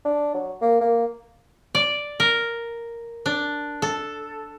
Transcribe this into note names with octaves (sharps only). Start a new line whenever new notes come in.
D4
F#3
A#3
A#3
D5
A#4
D4
A4